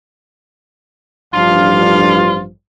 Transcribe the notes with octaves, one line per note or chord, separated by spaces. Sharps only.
A1 G2 F3 D4 F4 F5